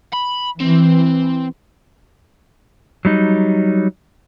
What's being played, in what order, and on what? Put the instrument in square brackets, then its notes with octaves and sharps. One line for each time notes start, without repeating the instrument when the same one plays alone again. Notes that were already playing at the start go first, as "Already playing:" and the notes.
[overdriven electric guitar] B5
[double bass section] E3 [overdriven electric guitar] C4
[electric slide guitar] F#3 G3 D#4